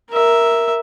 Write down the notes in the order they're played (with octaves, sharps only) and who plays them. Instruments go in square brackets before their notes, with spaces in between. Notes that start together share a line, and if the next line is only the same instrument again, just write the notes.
[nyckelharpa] A#4 E5